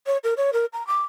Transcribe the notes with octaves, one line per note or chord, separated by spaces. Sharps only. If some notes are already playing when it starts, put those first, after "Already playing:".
C#5
A#4
C#5
A#4
A#5
D6